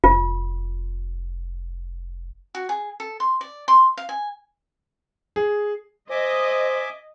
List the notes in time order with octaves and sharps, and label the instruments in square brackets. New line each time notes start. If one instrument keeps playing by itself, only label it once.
[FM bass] F1 [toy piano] F4
[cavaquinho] F#4
G#4
A4
C6
D5
C6
F5
G#5
[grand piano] G#4
[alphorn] C5 [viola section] D#5 [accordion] E5 G#5 D6